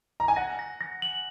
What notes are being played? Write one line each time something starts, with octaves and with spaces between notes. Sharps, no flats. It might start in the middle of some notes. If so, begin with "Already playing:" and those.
A#5
G#5
F#5 A#6
A#6
A#6
F#7